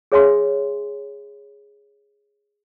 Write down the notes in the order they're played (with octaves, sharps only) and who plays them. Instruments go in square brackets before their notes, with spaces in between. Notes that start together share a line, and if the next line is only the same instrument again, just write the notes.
[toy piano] G#4 C#5 E5 G#5 C6